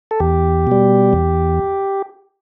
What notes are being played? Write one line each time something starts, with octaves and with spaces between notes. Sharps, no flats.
A4
E2 G4
B2 G3
E2